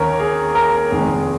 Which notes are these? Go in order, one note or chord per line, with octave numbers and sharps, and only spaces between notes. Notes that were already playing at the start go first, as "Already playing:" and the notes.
Already playing: D#2 D#3 C#4 A#4 C#5
G#4
A#4
F1 D#2 D#3 G#3 G#4